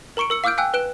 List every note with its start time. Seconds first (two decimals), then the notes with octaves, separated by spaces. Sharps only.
0.17 A#4 A#5 C#6 C#7 D7
0.30 A#4 E6 C#7
0.44 F5 D6 E6 F6 G6 D7
0.58 F5 G5 G#5 E6 F#6
0.74 B4 F#6 D7 E7